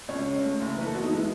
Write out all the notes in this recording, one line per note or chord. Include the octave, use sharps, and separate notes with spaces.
C#2 C#5
C#3
A3
F#1
E3 B4
A4
B3 F#4
D#4
G#3 E4